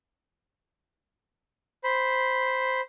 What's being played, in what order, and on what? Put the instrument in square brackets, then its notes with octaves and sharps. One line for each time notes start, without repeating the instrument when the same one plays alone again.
[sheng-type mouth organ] C5 B5